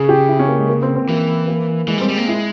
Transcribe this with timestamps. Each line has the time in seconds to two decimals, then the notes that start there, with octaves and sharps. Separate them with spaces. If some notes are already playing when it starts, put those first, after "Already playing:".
Already playing: C#3 G#4
0.09 G4
0.29 E4
0.39 C#4
0.48 A#3
0.59 G#3
0.69 A#3
0.82 C4
0.96 C4
1.09 E3 A#3
1.48 A#3
1.88 E3 G#3
1.98 G3
2.01 C4
2.08 G3
2.17 A#3
2.27 G#3 E4